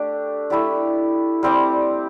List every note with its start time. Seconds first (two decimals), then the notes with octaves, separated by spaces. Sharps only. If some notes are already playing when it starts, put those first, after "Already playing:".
Already playing: A3 D4 G4
0.50 A3 E4 G4 D5
1.43 G3 C4 G4 D5